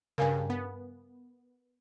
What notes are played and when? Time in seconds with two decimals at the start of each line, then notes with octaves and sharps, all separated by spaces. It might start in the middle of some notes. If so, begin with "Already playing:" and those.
0.18 G2 C#3 A#4 F5 G#5
0.50 B3